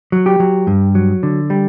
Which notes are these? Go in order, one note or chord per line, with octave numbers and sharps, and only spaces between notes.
F#3
G4
F#3
G2
F#3
D3
G3